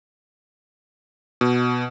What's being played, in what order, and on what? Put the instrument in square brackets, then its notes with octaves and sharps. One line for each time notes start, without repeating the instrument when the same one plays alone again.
[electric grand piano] B2